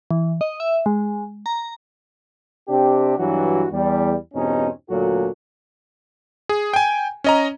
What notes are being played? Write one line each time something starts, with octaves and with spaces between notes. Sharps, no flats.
E3
D#5
E5
G#3
A#5
C3 C4 D4 G4
G2 E3 F#3 D4 F#4
E2 G3
E2 G2 B2 C4 C#4 D#4
D2 A#2 F#3 F#4 A4
G#4
G5 G#5
C#4 D#5 A#5